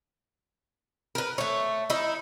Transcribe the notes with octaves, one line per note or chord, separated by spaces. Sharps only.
A#4 B4
A3 C#5
D#4 E4